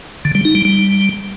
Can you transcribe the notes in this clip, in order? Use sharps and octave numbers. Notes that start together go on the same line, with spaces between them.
D3
G3
D#4
G3
G3